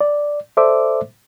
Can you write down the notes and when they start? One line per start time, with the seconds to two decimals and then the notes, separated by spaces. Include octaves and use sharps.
0.01 D5
0.57 A4 C5 D5 E5 D6